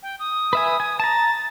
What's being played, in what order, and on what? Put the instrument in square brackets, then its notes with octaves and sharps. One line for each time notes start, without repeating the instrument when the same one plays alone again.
[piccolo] G5
D#6
[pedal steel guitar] B4 E5 G#5
G#5
[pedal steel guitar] A5 A#5 [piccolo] A6